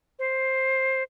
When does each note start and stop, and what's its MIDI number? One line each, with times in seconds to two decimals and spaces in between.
0.19 1.03 72